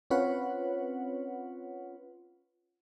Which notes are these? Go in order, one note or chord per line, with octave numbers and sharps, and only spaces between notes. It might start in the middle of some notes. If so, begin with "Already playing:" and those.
C4 C#4 F4 B4 C#5 F#5